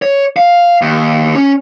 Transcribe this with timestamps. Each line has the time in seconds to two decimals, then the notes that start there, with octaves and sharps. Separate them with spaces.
0.02 C#5
0.37 F5
0.82 D#2
1.35 C#4